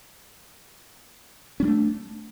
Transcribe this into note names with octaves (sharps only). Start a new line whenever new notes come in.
G3 A3 C#4 D4